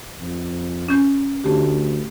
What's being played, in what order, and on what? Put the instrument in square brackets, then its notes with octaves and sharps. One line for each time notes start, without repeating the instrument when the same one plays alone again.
[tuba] F2
[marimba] C#4 G6
[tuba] D2 [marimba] A3 G4